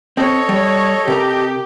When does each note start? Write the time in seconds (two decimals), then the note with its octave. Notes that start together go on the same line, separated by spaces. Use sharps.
0.17 C4 A4 C#5 D#5
0.49 G3
1.08 C3 G4 A#4 A#5